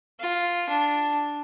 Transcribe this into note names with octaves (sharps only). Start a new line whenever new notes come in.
F4
D4